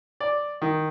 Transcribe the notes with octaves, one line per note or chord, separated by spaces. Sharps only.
D5
D#3